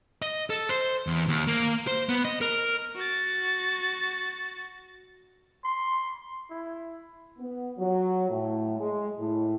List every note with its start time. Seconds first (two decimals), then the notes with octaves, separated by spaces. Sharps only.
0.22 D#5
0.50 A4
0.69 C5
1.07 E2
1.28 D#2
1.47 A#3
1.87 C5
2.09 B3
2.25 D#5
2.41 A#4
2.96 F#4 A6
5.64 C6
6.50 E4
7.39 B3
7.78 F#3
8.30 A2
8.79 G#3
9.18 A2